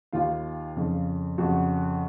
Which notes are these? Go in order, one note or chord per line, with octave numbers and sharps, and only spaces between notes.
D#2 D#3 F4 F5
F2 C#3
F2 C#3 F#4 F#5